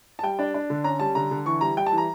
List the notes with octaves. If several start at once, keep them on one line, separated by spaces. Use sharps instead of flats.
A5
G3 G5
D4
D4
D3
C#4 A#5
G3 A5
D3 A#5
D3
E3 C#6
G3 A#5
G3 G5
A5
E3
A#5